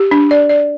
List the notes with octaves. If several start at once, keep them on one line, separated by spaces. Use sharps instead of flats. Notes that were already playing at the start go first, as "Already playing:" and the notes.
Already playing: G4
D4
D5
D5